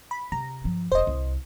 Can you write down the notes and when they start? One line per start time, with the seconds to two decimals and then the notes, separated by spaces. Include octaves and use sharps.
0.11 B5
0.32 C3 A#5
0.64 G2 F3
0.92 E1 A#3 C5 D#5
1.07 C2